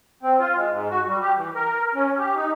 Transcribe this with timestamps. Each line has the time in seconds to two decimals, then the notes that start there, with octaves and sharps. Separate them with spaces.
0.23 C4
0.39 F4
0.56 G#3
0.70 G#2
0.90 F#4
1.08 G3
1.22 G4
1.37 E3
1.55 A#4
1.95 C#4
2.18 G4
2.35 D#4